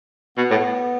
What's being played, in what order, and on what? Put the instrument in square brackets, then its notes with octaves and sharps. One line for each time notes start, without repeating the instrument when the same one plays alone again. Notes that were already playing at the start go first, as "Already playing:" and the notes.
[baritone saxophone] B2 [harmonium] B3
[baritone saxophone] A2